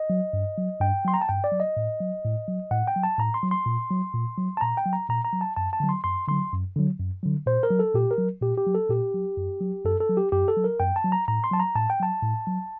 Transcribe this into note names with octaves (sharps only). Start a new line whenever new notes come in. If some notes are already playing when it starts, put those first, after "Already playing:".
Already playing: D#5
F#3
G2
F#3
G2 G5
F#3 C6
A#5
A5
G2 G5
D5
F#3
D#5
A2
F#3
A2
F#3
A2 F#5
G5
F#3
A5
A2 A#5
C6
F#3
C6
A#2
F#3
A#2
F#3
A5
A#2 A#5
G5
F#3
A#5
A#2 A#5
A#5
F#3
A5
F#2 A5
A5
D3 F#3
C6
F#2 C6
D3 F#3 C6
F#2
D3 F#3
F#2
D3 F#3
A#2 C5
A#4
F#3
A4
A#2 G4
A#4
F#3
A#2 G4
G4
F#3
A4
A#2 G4
F#3
F#2
F#3
F#2 A4
A4
F#3
G4
F#2 G4
A4
F#3
A#4
F#2 G5
A5
F#3
A#5
A2 A#5
C6
F#3 A5
A#5
A2 A5
G5
F#3 A5
A2
F#3